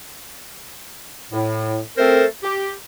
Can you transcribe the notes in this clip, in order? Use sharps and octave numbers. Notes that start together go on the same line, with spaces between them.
A2
A3 C4 A4 A#4 C5
G4